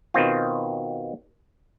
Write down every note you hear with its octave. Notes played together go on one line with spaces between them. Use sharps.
B2 D#3 C4 F4